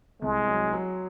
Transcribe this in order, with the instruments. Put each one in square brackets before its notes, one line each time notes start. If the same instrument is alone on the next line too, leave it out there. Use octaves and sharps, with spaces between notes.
[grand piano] C2 [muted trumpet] G#3
[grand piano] F#3
F#3